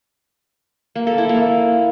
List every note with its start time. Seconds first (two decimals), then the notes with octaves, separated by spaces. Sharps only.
0.95 A#3
1.07 A4
1.18 E4
1.29 A#3